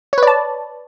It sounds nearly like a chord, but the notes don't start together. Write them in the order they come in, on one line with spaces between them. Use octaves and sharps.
C#5 B4 D5 A5